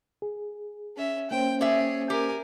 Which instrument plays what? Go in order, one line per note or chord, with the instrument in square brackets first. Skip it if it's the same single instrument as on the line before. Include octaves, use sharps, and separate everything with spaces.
[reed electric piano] G#4
[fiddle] C#4 E5
[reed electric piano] A#3 C#4 C5 [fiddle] G5
[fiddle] G#4 C#5 [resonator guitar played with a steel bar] D5 E5
[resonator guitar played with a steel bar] G4 [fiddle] A#4 G#5